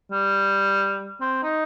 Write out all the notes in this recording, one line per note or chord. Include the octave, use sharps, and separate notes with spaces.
G3
C4
D#4